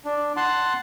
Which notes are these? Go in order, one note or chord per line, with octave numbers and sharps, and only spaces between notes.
D4
F#5 A5 C6